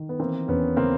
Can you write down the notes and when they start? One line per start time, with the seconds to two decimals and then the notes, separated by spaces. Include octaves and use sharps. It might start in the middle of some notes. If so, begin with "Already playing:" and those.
Already playing: D#3
0.09 B3
0.19 E3 A#3 C4
0.48 E2 B3 C#4
0.76 C#3 A#3 C4